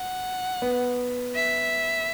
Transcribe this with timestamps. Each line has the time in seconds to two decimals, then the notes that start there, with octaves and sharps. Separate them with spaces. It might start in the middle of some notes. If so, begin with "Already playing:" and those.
Already playing: F#5
0.62 B3
1.36 E5